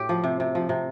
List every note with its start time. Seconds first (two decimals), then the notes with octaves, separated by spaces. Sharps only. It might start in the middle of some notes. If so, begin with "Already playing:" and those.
Already playing: A2 G4
0.09 F3
0.24 C3
0.40 C3
0.55 F3
0.69 C3